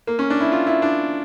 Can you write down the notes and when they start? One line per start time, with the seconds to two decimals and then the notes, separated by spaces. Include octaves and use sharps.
0.07 A#3
0.19 C#4
0.30 D4
0.40 E4
0.52 F4
0.67 E4
0.82 D4